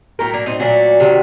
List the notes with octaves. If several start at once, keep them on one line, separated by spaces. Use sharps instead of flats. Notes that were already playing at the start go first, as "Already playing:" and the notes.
A2 F#3 A3 G4 A#4
A#3 D4
C4 D#4
A#2 F#3 A3 D4 F#4
C3 D#3 F#3